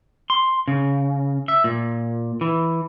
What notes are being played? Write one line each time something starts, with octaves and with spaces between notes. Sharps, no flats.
C6
C#3
E5
A#2
E3